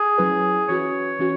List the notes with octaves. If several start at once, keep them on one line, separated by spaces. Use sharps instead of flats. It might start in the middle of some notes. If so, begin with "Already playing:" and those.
Already playing: G#4
F#3 C#4 E4 B4
E3 C#4 F#4 B4 C#5
E3 C#4 F#4